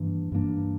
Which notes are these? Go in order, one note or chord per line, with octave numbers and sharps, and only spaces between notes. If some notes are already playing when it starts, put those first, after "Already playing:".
Already playing: G2 E3 A#3 D4
G2 E3 A#3 D4